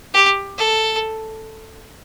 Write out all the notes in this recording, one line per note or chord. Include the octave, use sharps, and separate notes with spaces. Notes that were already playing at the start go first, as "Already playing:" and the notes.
G4
A4